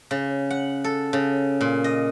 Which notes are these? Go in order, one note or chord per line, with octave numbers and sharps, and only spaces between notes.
C#3
F#5
A4
C#3
A#2
D#5